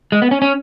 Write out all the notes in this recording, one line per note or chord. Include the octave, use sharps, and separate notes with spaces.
G#3
B3
C#4
C#4